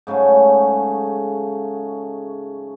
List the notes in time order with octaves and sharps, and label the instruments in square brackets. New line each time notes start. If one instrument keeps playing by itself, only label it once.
[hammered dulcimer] G#2 C#3 F#3 A3